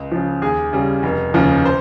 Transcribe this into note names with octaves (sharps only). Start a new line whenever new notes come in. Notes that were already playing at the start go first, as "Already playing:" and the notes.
Already playing: C#2
C#3 F3
D#2 G#4
C#3 G3
F1
D#2 C#3 F3
C5